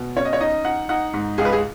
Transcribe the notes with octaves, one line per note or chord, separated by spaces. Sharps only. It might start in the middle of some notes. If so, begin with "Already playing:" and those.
Already playing: B2
C#4 C#5
D#5
C#5
D#4 D#5
D#4 F#5
D#4 F#5
G#2
C#2 G#4
B4
G#4